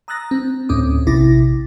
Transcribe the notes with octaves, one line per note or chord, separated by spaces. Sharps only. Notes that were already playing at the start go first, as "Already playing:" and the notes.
A#5 D#6 E6 F#6 A6 A#6
C4
D2 A2 C4 C#4 D6 D#6
A#1 C3 E4 D6 A6 A#6